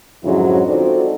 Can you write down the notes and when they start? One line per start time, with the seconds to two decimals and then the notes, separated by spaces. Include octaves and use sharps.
0.24 F2 G#2 D3 F#3 C#4 E4
0.67 C4 D#4 F4 F#4 A4 D5